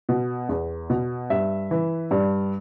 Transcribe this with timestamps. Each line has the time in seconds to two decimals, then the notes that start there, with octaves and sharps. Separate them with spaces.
0.09 B2
0.49 E2
0.90 B2
1.30 G2 E5
1.71 E3
2.11 G2 D5